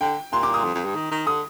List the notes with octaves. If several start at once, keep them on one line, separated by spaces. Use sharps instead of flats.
D3 G5
A#2 C6
D6
D#6
F2
F2
G2
D#3
D#3
D3 D#6